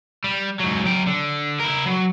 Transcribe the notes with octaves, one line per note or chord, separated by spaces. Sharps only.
G3
G#2 F#3
F#3 G5
D3
E4 A#4
F#3